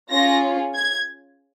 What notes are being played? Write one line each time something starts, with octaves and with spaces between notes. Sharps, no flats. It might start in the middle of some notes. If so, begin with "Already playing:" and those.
C#4 F4 G#4 A#6
G#6